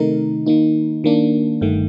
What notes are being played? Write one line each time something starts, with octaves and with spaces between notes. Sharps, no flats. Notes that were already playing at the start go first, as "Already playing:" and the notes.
Already playing: C3 D#3 A3 D#4 A#4
D#3 A#3 D#4
D#3 A#3 D4
G1 G2 D#3 A3